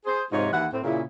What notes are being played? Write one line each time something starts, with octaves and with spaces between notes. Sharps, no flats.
G#4 C5
F2 G#2 C3 F4 C#5 D#5
D#2 E3 E4 F#5
A2 C4
A#2 C#3 E4